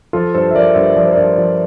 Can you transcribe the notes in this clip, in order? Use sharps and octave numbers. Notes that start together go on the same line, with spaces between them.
F3 F4 A4
G2 A4 C5
E5
F3 A#4 D5
G2 C5 E5
F3 D5
C5
G2 A#4 D5
F3